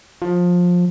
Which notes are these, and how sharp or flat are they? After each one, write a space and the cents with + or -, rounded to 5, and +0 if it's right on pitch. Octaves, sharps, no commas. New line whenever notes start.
F3 +20